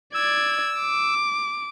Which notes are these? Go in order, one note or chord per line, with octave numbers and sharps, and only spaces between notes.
D5 E6 G#6
D6